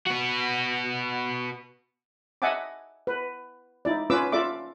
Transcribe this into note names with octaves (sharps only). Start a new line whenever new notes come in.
B3 F#4
D#5 E5 F#5 G#5 A5 D6
B4
D#4 E4 D5
C#4 F4 B4 D6 E6
F4 A4 D5 E5 D6